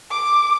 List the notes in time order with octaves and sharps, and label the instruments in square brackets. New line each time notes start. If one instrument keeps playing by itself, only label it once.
[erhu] D6